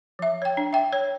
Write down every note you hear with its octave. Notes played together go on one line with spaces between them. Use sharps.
F3 E5
C#5 G5
D4
E5 G5
C#5